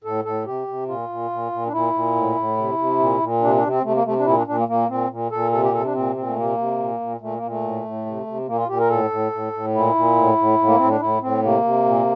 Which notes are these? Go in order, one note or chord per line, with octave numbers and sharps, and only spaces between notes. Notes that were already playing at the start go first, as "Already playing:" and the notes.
A2 A4
A2 A4
C3 G4
C3
A#2 F4
A#2
A#2
A#2
D4
A#2 E4
A#2
A2
A2
C3
C3
A#2
A#2
C3 D4
D4
C3
C4
C3 A3
A#3
C3 A3
D4
A#2 E4
D4
A#2 D4
A#3
A#2 A#3
A#2 C4
A#2
A#2 A4
C3 A4
G4
C3 A4
D4
A#2 C4
A#2 C4
A3
C3 A#3
C3
A#2
A#2
A#2 A3
A#3
A#2
A3
A2
A2
C3
C3
A#2 A#3
F4
A#2 G4
A#4
A2 A4
A2
A2
A2
A#2 E4
A#2
A2
A2
A2
A#3
A2 C4
D4
A2 E4
A2 C4
C3 A#3
C3
A#2